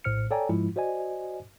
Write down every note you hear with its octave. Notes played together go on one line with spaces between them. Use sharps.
A#1 A2 C5 F6 C#7
A4 C#5 D5 G5 G#5 A#5
G#2 F3 G#3 E4 F4
F#4 C5 D5 D#5 G#5